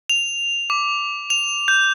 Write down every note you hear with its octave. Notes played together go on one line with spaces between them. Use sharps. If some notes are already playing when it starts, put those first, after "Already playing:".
F7
D6
F7
G6